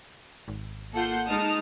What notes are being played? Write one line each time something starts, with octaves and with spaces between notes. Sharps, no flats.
G#1
A#3 F4 A4 F#5 G6
G#3 D#4 A5 D#6 F6